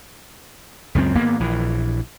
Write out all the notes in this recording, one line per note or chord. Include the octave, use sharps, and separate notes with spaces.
C#2 F#2 F#3 C4
G#1 A#3 B3
A#1 E3